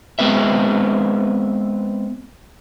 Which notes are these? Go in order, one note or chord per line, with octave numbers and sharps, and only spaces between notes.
G#3 B3 C4 B4 E5